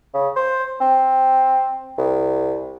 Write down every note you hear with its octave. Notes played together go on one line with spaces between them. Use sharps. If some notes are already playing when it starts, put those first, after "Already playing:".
C#3
C5
C4
C2